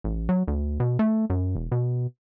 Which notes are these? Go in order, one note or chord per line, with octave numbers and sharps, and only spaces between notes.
A1
F#3
D2
B2
A3
F#2
E1
B2